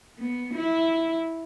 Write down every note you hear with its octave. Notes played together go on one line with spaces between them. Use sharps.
B3
E4